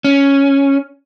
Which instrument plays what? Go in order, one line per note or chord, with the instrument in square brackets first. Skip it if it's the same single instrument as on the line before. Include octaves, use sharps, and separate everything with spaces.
[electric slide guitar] C#4